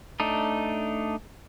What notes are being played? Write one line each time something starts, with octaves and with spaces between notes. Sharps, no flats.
A3 D4 D#4